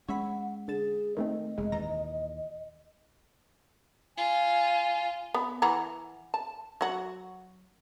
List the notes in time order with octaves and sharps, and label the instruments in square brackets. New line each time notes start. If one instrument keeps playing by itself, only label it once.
[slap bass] G#3 C#4 [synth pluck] C#5 E5 B5 [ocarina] F#5
[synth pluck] D3 A6 E7 [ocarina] G#4
[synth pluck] D#3 A3 C4 [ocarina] D#5
[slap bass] F1 [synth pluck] G#3
[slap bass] D#2 A#2 E3 [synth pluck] A#5
[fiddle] F4 [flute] G#5
[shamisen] B3
E3 F#5 A#5
A5
F#3 F#4